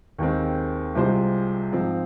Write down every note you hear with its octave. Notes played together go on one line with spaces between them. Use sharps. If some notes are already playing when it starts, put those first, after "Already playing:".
D#2 D#3 G#3 C4
C2 C3 G#3 F4 C5
G#2 F3 C4